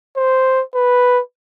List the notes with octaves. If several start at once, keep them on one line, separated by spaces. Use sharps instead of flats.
C5
B4